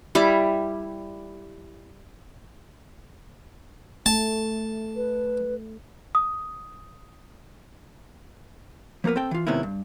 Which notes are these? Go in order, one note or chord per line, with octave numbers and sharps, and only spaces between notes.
G3 E4 D6
A3 A5
B4
D#6
F3 A#3 B3 A#4 B4
C4 A4 G5
E3 F4
G#2 C3 D#3 B3 C#4 E4
G2